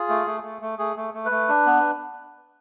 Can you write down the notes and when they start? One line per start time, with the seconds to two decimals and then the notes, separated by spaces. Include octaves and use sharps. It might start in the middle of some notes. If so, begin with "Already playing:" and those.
Already playing: F4 G#4
0.09 A3
0.27 A3
0.43 A3
0.62 A3
0.79 A3 G#4
0.96 A3
1.14 A3
1.26 B4
1.31 A3
1.49 D4
1.66 B3